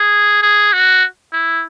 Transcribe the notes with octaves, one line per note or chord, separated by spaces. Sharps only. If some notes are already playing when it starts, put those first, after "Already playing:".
Already playing: G#4
G#4
F#4
E4